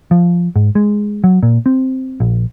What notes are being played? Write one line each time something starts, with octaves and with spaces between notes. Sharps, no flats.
F3
G#2
G#3
F#3
A#2
C4
A#1